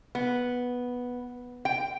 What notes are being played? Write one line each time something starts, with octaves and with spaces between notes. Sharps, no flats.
B3
G5